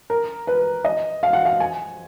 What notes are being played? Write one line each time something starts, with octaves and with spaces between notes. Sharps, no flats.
A#4
B4
D#5
F5
F#5
F5
G#5